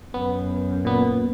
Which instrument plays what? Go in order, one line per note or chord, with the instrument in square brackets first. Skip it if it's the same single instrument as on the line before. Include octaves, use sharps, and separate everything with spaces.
[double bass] F#2 [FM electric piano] B3
[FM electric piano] A#2 B3